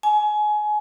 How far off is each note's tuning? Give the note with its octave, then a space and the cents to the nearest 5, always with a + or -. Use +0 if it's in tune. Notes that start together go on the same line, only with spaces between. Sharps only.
G#5 +25